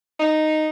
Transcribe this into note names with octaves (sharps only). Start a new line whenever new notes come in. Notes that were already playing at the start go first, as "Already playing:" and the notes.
D#4